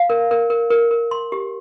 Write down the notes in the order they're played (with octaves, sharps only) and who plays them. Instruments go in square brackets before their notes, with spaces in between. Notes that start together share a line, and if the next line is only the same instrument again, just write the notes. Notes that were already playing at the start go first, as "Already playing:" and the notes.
Already playing: [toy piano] F5
A#4
A#4
A#4
A#4
A#4
C6
G4